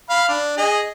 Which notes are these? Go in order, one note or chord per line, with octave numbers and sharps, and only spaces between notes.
F5 B5
D4
G#4 D#5